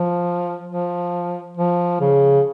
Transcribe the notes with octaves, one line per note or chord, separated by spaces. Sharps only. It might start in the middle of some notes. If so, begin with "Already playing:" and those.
Already playing: F3
F3
F3
C#3